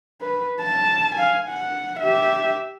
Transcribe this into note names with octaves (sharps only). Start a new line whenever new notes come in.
B4
A5
F5 G#5
F#5
G4 E5